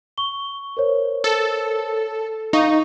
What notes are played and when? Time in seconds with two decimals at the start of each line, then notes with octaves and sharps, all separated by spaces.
0.18 C#6 G7
0.77 A#4 C5 C#5
1.24 A4
2.53 D#4 F5 C#6